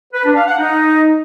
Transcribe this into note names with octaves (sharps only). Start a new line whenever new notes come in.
B4
D4
F5
F#5
D#4